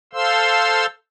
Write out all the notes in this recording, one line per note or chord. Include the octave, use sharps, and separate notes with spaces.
A4 C5 F5 C6 E6